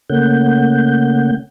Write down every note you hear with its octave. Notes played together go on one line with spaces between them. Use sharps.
C#3 A3 A#3 C#4 F#5 G6